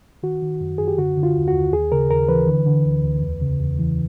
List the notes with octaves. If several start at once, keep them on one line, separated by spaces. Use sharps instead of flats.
D#3 F#4
D#3
F#2
F#2 G#4
G4
D3 F#4
D3
F4
D#2
F#4
D#2
D#2 G#4
C#3 A#4
D#2 A#4
E3 B4
D3
D3
D2
D2
E2
C#3
E2
E3